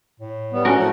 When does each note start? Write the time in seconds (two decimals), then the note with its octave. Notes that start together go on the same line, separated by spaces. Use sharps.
0.20 A2
0.52 G3 B3
0.65 A3 C#4 D4 F#4 A#4
0.78 A2 F3 F#5